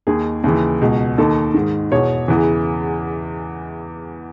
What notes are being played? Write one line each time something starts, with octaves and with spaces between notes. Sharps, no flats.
D#2 D#3 G#4
D#2 C#3 E3
C#2 B2
D#2 D#3 A4
G#2 D#3
E2 B2 C#5
E2 C#3 E3